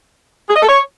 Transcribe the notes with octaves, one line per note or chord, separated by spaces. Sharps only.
G#4
D#5
A4
C#5